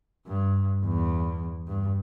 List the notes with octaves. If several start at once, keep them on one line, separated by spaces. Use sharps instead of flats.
G2
E2
G2